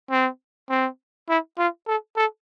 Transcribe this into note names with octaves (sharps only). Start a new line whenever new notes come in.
C4
C4
E4
F4
A4
A4